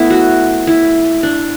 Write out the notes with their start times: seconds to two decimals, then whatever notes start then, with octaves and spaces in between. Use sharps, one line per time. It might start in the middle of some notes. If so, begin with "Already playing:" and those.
Already playing: A3 B3 E4
0.10 F#4
0.67 E4
1.23 D4